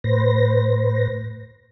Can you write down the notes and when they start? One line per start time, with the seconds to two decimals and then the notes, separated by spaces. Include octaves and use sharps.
0.04 A2 B4 C5 A#6